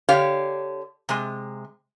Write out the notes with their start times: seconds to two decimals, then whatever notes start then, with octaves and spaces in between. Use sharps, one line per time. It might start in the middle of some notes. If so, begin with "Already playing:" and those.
0.09 D3 G4 C#5 F5
1.09 C3 G#3